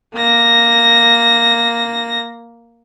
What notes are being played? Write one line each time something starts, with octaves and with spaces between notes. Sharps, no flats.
A#3 A#6